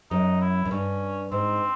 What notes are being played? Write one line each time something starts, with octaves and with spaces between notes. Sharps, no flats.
F#2 D#4
E4
F#2
G2 C#4
G#2 C4